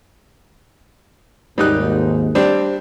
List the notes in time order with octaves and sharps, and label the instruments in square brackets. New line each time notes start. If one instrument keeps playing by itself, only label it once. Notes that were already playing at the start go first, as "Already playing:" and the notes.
[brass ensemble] G#1 D#2 G#2 [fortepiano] G3 D#4 F#6
[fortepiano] G3 C4 D4